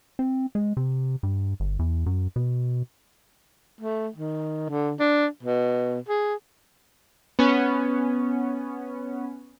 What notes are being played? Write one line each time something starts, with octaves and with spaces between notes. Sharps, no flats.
C4
G#3
C3
G2
G1
E2
F#2
B2
A3
D#3
D3
D4
B2
G#4
B3 C#4